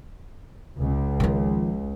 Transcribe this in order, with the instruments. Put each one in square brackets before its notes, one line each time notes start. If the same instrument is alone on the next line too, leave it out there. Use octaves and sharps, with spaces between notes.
[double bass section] C#2
[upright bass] D#3 F3